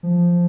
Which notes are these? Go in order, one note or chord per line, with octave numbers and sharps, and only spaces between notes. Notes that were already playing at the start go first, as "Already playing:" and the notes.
F3